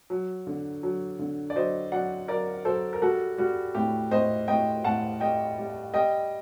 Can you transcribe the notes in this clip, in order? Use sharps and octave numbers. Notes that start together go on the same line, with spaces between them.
F#3
D3
F#3
D3
D5
F#3 C5 D#5
F#3 D5 F#5
F#3 A#4 D5
F#3 A4 C5
A#4
G3 F#4 A4
G3 F#4
A2 G4
A2 C5 D#5
A2 D#5 G5
A2 F#5 A5
G3 D#5 G5
G3
G3 D#5 G5